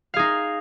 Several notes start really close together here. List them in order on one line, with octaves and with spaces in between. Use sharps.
F5 G#4 D#4